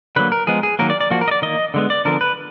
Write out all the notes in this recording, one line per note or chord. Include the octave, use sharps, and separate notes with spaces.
D3 F#3 A#3 B4
A#4
F3 G#3 B3 G#4
G#4
D#3 F#3 A#3 A#4
D5
D5
F3 A#3 F#4
A#4
D#5
D5
D#3 A#3 D#5
D3 G#3 B3
D5
D3 F3 B3 A#4
B4